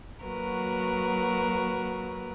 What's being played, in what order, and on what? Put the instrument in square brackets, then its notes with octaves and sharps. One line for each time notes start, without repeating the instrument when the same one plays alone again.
[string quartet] F#3 A#3 F#4 A#4 B4